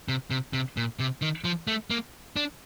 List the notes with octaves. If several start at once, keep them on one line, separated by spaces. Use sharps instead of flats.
C3
C3
C3
A#2
C3
D#3
F3
A3
A#3
D4